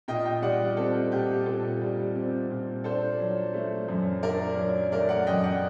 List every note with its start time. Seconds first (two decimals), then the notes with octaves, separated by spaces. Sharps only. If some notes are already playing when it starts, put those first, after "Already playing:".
0.08 A#2 D#5 G5
0.25 D#5 G5
0.42 G3 D5 F#5
0.59 G4
0.77 C4 A4
1.12 A#2 G4
1.46 A#2 A4
1.81 G3
2.15 C4
2.50 A#2
2.84 D4 A4 C5
3.19 F#3
3.54 A3
3.88 F#2
4.23 D4 A#4 D5
4.57 F#3
4.92 A3 A#4 D5
5.09 D5 F#5
5.27 F#2 D#5 G5
5.43 D5 F#5